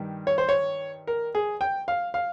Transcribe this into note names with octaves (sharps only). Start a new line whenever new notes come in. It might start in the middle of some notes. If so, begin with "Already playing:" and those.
Already playing: G2 D#3 G3
C#5
C5
C#5
A#4
G#4
G5
F5
F5